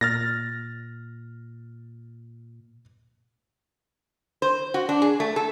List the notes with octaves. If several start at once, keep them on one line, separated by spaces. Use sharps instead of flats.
A#2 F6 A6 A#6
C5
F#4
D4
G#4
A3
A4